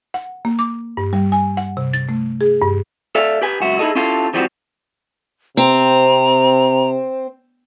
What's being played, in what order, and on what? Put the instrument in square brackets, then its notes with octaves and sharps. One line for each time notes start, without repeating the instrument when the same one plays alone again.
[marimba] F#5
A#3
D6
G2
G3
G#5
F#5
C3
A6
A3
G#4
G2
[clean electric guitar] A4 D5 E5 F5
G4 B4 G#5
C#2 F#2 F#4 E5
D#4 E4 G#4 A4 D#5
C#4 E4 F4 G4 A4 A5
E3 F3 G3 C4 F#4 G4
[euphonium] C3 [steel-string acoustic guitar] C4 [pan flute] A#5